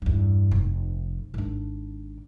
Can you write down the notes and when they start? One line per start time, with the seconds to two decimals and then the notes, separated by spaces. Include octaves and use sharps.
0.02 E2 G2
0.51 F1
1.34 G#1 D4